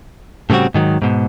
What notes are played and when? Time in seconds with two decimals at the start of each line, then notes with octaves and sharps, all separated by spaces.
0.50 A2 C#3 G3 C4 F#4
0.74 G#2 D#3 F#3
1.02 G#2 B2